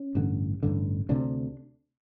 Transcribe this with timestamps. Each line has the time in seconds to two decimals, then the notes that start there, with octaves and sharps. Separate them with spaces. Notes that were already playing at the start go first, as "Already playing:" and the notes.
Already playing: C#4
0.15 A1 G2 D3
0.63 A1 G2 D3
1.09 D2 C3 D4